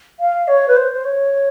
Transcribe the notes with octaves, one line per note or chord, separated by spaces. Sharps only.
F5
C#5
B4
C5
C5
C#5